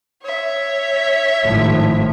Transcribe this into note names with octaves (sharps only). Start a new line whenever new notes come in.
C#5 E5
G#1 A2 F3